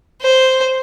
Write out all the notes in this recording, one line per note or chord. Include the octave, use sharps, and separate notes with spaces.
C5